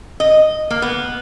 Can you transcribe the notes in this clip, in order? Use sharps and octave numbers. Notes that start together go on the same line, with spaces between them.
D#5
A#3
B3